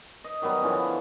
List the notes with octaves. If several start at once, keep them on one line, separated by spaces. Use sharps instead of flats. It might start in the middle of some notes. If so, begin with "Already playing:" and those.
D#5
D#3 F#3 G3 B3
D3 E3 F3 C#4